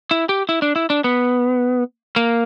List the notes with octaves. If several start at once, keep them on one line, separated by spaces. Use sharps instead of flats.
E4
G4
E4
D4
E4
D4
B3
A#3